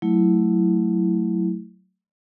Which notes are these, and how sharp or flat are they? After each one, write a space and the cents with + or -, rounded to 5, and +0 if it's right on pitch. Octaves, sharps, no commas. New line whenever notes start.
F#3 +0 A3 +0 E4 +0